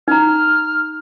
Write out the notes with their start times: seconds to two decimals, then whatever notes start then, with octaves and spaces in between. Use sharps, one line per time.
0.08 D#4 A#5 F6